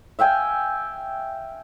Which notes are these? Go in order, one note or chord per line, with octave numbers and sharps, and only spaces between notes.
E5 F5 G5 G#5